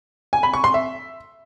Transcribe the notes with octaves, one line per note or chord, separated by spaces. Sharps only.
G#5
B5
C#6
C6
E5